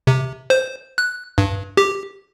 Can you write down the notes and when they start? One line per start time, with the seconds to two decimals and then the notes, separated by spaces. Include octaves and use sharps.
0.07 C3
0.50 C5
0.98 F#6
1.38 G2
1.77 G4